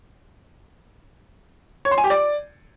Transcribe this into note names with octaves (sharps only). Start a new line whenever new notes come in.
C#5
C6
G#5
G4
D5